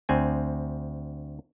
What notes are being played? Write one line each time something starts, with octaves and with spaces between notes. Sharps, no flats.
D2 C4 G#5